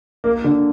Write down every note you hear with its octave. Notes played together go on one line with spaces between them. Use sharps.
A#3
D3